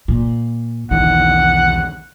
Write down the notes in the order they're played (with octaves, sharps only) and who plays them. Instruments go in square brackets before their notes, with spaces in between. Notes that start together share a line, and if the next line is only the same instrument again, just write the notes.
[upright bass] A#2
[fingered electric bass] B1 E2 D#3 [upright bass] D3 [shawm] F#5